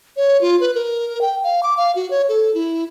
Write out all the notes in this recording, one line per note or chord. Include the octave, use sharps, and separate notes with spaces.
C#5
F4
B4
A#4
G5
F5
D6
F5
F#4
C#5
A4
E4